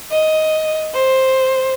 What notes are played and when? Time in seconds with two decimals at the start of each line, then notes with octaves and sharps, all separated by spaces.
0.10 D#5
0.94 C5